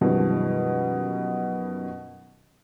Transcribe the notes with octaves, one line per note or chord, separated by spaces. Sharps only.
F#2 B2 D#3 F3 G3